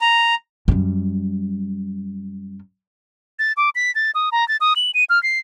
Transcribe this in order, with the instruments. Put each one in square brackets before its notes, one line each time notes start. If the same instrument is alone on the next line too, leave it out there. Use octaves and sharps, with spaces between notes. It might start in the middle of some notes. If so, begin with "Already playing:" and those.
[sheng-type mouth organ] A#5
[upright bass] F#2 G3
[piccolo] A6
D6
B6
A6
D#6
A#5
A6
D#6
F#7
D#7
F6
C7